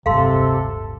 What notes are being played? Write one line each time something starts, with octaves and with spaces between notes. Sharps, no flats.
D1 G1 G2 C3 A4 F5 C6